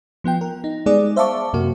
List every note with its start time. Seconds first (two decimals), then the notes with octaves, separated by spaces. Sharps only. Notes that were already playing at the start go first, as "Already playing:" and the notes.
0.24 F3 B3 F4 G5
0.41 A#4
0.64 D#4
0.86 G3 G#3 B3 D#4 G#4 D5
1.16 C5 E5 F5 A5 C#6 D6
1.53 F#2 C3 A#3 F#4